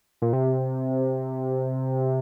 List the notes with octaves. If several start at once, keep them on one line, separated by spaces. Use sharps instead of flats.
A#2
C3